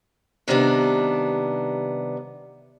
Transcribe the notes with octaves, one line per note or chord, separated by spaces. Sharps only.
C3 D#3 G3 B3 C#4 D4